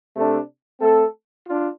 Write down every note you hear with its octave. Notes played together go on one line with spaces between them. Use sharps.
C3 A3 D4 A4
A3 C4 A4
D4 F4